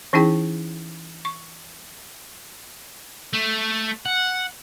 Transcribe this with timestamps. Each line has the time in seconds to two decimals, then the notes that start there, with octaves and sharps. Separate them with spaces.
0.13 E3 C#4 D#4 E4 G#4 G5
1.25 C#6
3.33 A3
4.06 F#5